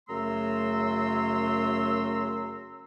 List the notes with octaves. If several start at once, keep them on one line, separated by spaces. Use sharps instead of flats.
F#2 C#3 A3 A#5 C6 E6